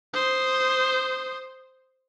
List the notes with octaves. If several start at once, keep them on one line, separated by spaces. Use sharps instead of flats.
C5 D#6